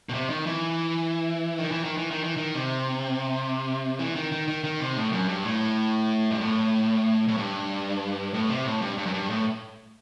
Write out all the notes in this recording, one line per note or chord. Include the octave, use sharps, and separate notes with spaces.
B2
C3
D#3
E3
D#3
E3
D#3
E3
D#3
E3
D#3
C3
E3
D#3
D#3
D#3
D#3
C3
A2
F#2
G2
A2
G2
A2
A2
G2
A2
C3
A2
G2
G2
F#2
G2
A2